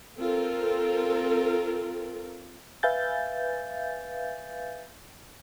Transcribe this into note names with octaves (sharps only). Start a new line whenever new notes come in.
C4 F4 A4 A#4
B4 E5 F5 G#5 G6 A6